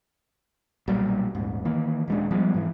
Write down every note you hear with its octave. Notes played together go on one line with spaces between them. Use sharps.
B1 A#2 F#3 G3
D#1 G#2
D#3 E3 A#3
D#1 G#3 D4
F3 G3 G#3 B3
G#2 E3